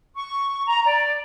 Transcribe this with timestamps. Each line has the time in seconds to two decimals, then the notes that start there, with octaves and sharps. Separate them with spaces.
0.16 C#6
0.66 A#5
0.85 D5